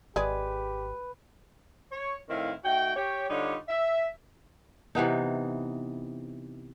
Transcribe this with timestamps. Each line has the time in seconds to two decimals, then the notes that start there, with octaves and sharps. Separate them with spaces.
0.16 G#1 G#3 G4 G#4 B4 D5
1.91 C#5
2.30 A2 D#3 C4 E4 F5
2.64 A3 D#4 F#4 G5
2.95 G4 C#5 G5
3.29 D3 G3 D4 D#4 F4 C#5
3.68 E5
4.95 C3 E3 B3 D#4